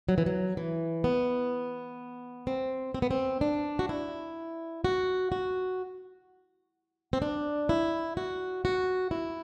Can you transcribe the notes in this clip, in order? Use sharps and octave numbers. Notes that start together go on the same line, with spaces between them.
F#3
E3
F#3
E3
B3
C4
C4
B3
C4
D4
F#4
E4
F#4
F#4
C4
D4
E4
F#4
F#4
E4